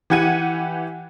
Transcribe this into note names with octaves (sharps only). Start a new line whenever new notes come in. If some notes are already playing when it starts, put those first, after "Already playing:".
E3 G4 F#5 G#6 D#7